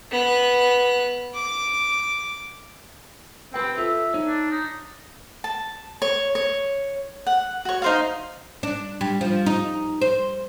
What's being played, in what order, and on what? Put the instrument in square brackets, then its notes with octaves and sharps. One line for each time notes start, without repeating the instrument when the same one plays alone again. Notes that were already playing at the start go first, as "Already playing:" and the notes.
[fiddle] B3 F#6
D6
[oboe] C4 [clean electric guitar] G4 B4 G5
[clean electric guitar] F4 A4 [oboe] E5
[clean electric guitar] D#4 C#5
[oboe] D4
D#4
[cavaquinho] A5
C#5
C#5
F#5
F#4 C#5
D#4 C5 F5
[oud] D4
G3
F3
D#4
C5